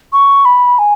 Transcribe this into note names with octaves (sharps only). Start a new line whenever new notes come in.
C#6
B5
G#5